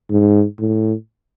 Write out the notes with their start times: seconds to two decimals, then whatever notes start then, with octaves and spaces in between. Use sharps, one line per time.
0.10 G#2
0.59 A2